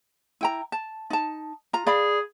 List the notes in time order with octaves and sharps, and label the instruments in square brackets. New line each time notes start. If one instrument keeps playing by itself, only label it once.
[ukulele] E4 G5 A#5
A5
D#4 A5
F4 A#5
[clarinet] G#4 [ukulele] D5 F5 B5